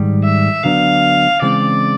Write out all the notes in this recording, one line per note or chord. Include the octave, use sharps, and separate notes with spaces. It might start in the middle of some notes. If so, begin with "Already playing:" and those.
Already playing: G#2 D#3 G3
E5
D2 D3 F#3 B3 D4 F5
C#3 E3 G#3 C4 D5